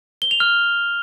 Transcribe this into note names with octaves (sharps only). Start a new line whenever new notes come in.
G7
F7
F6